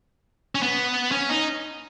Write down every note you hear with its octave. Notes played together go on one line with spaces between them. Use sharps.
C#4
B3
C#4
D#4